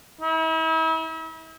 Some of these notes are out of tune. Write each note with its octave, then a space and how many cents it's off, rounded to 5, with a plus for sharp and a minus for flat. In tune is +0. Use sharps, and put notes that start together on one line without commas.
E4 -40